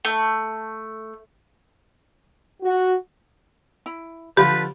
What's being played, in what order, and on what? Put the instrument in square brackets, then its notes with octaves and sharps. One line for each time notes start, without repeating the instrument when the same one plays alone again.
[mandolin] A3
[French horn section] F#4
[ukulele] E4
[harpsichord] D3 F3 F4 [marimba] G4 [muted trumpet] B4 [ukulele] B5